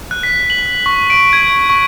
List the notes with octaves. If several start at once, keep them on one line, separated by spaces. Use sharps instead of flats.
F#6
B6
F#7
C#6
D7
G#6
C#6